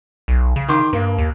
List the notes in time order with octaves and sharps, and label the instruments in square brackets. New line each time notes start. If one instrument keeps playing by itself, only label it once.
[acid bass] B1
C#3
[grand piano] D#3 C6 D6
[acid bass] G2 [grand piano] A#3
[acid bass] D#2